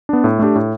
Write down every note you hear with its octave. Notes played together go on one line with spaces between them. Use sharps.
B3 D4
A2
A3 D4 G4
A2